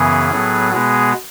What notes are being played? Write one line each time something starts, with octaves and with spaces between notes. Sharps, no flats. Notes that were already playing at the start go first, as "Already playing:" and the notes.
Already playing: F#2 C#3 E3 B3 G#4
A2 F#3 B3
B2 G#3 B3 G#4